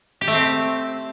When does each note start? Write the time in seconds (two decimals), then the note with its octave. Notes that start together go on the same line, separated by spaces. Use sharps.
0.21 G4
0.28 A3
0.34 C4